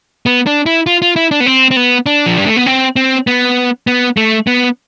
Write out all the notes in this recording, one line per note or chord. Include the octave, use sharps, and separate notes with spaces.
B3
D4
E4
F4
F4
E4
D4
B3
C4
C4
B3
D4
F3
G3
A3
B3
C4
C4
B3
B3
A3
B3